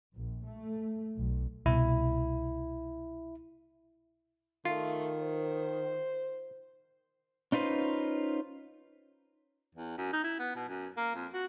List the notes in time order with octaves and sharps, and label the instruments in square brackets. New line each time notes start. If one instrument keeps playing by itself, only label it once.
[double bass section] A#1
A3
B1
[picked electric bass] C2 B2 [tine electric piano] E4
[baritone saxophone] D#3 [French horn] A3 [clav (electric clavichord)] F4
[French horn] C5
[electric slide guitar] C#4 D#4 F4 B4 C5
[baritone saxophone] E2
F#2
D#4
E4
B3
B2
F#2
A#3
F2
F#4